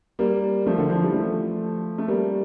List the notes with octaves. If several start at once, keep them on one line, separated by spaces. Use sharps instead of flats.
G3 A#3
F3 A3
D3 F3
D3 F3
E3 G3
F3 A3
A3
G3 A#3